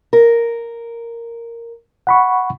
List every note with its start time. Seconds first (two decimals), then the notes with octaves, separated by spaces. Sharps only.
0.13 A#4
2.07 F#5 B5 C#6